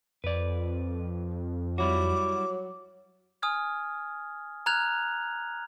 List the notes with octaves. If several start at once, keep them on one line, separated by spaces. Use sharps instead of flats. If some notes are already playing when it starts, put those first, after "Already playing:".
F2 B4 D5
F#3 G3 E4 F#4 D6
G#5 D#6 F6 G#6
A#5 F6 F#6 G#6 F7